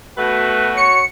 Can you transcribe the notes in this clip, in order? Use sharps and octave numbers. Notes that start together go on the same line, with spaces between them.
B2 A3 F#4 B4
C#5 C#7